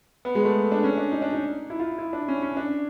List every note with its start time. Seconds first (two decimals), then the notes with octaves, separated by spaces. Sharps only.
0.25 B3
0.35 G#3
0.45 A3
0.72 D4
0.84 C#4
0.97 D4
1.12 D#4
1.22 D4
1.33 D#4
1.70 E4
1.80 F4
1.98 E4
2.13 D4
2.28 C#4
2.42 C#4
2.57 D4